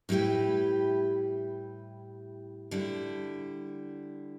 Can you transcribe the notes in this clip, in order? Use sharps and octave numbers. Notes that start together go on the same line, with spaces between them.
A2 G3 E4 G4 B4
D3 G3 E4